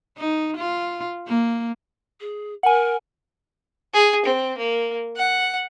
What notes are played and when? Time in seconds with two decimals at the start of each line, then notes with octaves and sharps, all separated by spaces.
0.17 D#4
0.57 F4
1.27 A#3
2.20 G#4
2.63 A#4 F#5 G#5
3.94 G#4
4.25 C4
4.57 A#3
5.16 F#5